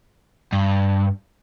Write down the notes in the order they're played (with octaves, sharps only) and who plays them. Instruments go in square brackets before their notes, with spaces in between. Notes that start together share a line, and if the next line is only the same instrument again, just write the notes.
[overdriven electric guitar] G2